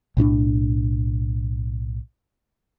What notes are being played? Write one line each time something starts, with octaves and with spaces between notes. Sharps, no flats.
B1 A2 C#4 D4